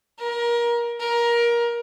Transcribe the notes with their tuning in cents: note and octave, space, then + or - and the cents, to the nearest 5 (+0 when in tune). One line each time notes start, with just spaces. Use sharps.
A#4 +25
A#4 +20